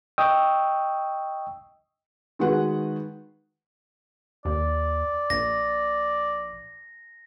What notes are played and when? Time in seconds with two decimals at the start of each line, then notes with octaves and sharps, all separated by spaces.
0.18 D#5 G5 C#6 D#6 E6
2.39 D#3 G#3 F#4 B4 F#5
4.45 D#2 D5
5.30 A#1 A#6